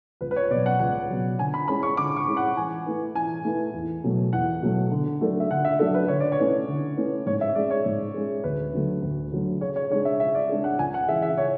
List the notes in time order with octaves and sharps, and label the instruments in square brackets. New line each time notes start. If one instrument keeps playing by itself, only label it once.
[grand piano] C#2 [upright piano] B4
[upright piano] B4
C#5
[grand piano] B2 [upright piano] D5
[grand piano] F#3
[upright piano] F#5
[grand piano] C#2 [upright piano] F#5
[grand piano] B2 F#3
[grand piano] D3 [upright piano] G#5
[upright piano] B5
[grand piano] G#3 C#4 E4 [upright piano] B5
[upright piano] C#6
[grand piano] D3 [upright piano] D6
[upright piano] C#6
[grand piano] G#3 C#4 E4
[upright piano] F#5
[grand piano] E3 [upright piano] G#5
[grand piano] A3 E4 B4
[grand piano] E3 [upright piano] G#5
[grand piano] A3 E4 B4
E2
B2 F#3 A3
[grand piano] E2 [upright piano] F#5
[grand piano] B2 F#3 A3
D3
F#3 A3 D4 A4
[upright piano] E5
[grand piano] D3 [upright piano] F#5
[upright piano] E5
[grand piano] F#3 A3 D4 A4 [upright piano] E5
[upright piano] B4
[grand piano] D3 [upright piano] C#5
[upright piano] D5
C#5
[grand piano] A3 C#4 E4 B4
D3
A3 C#4 E4 B4
[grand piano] G#2 [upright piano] C#5
[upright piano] E5
[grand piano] G#3 C#4 G#4 [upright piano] D5
[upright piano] C#5
[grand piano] G#2
G#3 C#4 G#4
[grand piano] D2 [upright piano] B4
[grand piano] D3 F#3 A3
D2
D3 F#3 A3
[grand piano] C#3 [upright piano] C#5
[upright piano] C#5
[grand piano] G#3 D4 G#4 [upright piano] C#5
[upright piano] E5
[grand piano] C#3 [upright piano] E5
[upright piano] D5
[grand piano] G#3 D4 G#4
[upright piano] F#5
[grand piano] C#2 [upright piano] G#5
[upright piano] F#5
[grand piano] C#3 E3 [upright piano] E5
[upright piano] E5
C#5